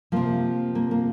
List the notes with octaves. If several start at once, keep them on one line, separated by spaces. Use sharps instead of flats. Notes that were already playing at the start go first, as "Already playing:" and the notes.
C3 F3 A#3
A#3
A#3